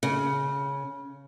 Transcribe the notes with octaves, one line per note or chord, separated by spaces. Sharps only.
C#3